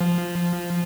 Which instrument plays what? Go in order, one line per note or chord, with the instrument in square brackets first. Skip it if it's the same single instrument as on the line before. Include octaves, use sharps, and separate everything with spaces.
[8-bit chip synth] F3